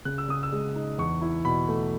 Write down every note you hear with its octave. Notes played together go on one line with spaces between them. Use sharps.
C#3 F#6
E6
C#3 D#6
E6
G#3
D#4
E2 C#6
E4
B2 B5
A3